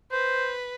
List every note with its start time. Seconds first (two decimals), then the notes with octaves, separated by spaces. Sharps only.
0.12 B4 C5